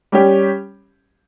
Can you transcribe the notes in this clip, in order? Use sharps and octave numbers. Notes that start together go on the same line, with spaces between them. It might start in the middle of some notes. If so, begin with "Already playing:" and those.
G3 C#4 G4